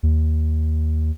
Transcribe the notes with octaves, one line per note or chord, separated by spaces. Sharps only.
D#2